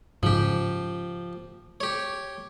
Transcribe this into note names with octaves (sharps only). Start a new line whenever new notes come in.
G#2 C#3 F3 G4
G4 C#5